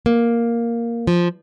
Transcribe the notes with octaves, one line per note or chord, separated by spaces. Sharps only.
A#3
F3